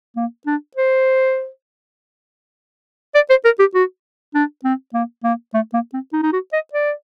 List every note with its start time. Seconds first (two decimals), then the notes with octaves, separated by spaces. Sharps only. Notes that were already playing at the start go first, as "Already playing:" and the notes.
0.16 A#3
0.46 D4
0.76 C5
3.15 D5
3.29 C5
3.44 A#4
3.59 G4
3.74 F#4
4.34 D4
4.64 C4
4.94 A#3
5.24 A#3
5.54 A3
5.73 A#3
5.93 C4
6.12 D#4
6.23 D#4
6.32 F#4
6.53 D#5
6.73 D5